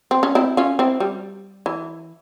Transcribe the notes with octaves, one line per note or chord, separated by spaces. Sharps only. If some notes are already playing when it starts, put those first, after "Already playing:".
C4
C#4
C4 E4
C#4 F4
C4 E4
G3
E3